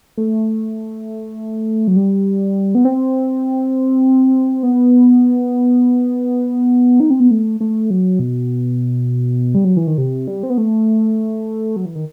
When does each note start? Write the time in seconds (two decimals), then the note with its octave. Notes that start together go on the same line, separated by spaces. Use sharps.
0.17 A3
1.87 F#3
1.96 G3
2.75 B3
2.85 C4
4.63 B3
7.00 D#4
7.10 C4
7.20 B3
7.31 A3
7.60 A3
7.90 F#3
8.19 B2
9.55 G3
9.65 F#3
9.77 E3
9.87 D#3
9.98 C3
10.27 G3
10.43 C4
10.50 B3
10.58 A3
11.76 F#3
11.86 E3
11.95 D#3